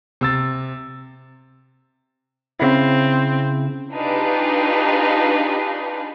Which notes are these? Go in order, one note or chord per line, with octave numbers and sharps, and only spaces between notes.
C3 E6 A6
C#3 C4 E4
D4 D#4 F4 G4 G#4 B4